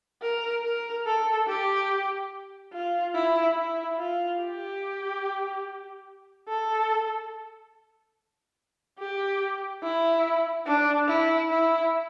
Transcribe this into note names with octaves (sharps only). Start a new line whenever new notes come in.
A#4
A#4
A4
G4
F4
E4
E4
F4
G4
A4
G4
E4
D4
E4
E4